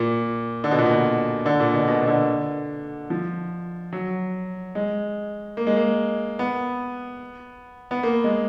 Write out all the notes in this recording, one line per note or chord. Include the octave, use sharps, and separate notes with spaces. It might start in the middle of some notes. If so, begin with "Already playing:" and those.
Already playing: A#2
D3
B2
A#2
B2
D3
A#2
B2
B2
B2
D3
F3
F#3
G#3
A#3
G#3
A#3
B3
B3
A#3
G#3